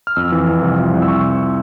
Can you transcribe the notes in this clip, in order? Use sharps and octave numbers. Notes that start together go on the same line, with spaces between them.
F6
F2 E6
E3
F2
C2
F3
C2
E6
C#6